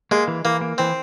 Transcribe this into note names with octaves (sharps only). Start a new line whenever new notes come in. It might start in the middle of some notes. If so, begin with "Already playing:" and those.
G#3 A#3
E3
E3 A#3
A#3
E3 C4